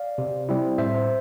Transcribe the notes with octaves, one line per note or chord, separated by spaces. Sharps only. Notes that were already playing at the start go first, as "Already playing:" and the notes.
Already playing: D5 F5
C3
G3 C4 E4
A2 C5 E5